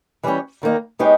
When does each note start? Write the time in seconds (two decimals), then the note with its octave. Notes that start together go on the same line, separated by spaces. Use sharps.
0.23 E3 G3 C#4 G4 C#5
0.62 E2 D#3 A#3 D#4
0.99 G#3 B3 D#4 G4 C#5